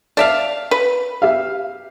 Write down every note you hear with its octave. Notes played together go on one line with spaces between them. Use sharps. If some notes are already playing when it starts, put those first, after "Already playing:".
D5 E5 F5 A5
B4
G4 E5 F5